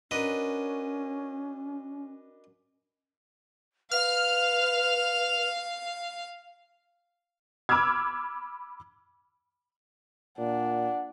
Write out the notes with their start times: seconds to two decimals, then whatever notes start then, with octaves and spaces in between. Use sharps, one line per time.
0.11 C#4 D4 F#4 A#4 B4 D#5
3.91 B4 F5 F6
7.69 B5 D6 E6 F6 G#6
10.38 A#2 D4 F#5